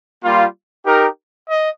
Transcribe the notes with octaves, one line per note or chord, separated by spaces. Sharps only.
G3 A#3 F4
D#4 G4 A#4
D#5